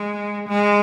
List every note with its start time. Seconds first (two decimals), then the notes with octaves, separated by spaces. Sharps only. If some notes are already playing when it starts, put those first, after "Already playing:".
Already playing: G#3
0.48 G#3